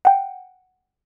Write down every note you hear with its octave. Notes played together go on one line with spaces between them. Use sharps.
F#5 G5